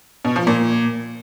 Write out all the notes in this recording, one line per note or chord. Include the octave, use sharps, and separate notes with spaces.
B2
F3
A#2